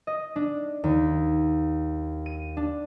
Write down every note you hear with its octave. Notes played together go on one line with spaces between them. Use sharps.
D#5
D4
D#2
D#7
D4